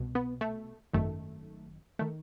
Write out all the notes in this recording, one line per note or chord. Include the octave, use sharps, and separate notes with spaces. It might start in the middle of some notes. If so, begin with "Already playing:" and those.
Already playing: C2 B2
B3
A3
G#1 F#2 D#3 A3
D#3 A3